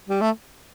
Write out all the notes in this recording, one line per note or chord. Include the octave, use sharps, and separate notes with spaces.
G3
A3